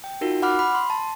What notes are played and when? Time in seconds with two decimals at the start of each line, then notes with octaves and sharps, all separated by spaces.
0.04 G5
0.21 D#4 F4 F#4 A#4
0.42 F#5 B5 D6 F6
0.59 B5
0.75 C6
0.90 A5